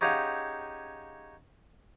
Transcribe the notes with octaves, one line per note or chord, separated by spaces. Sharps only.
C#4 D#4 G4 G#4 F5 F#5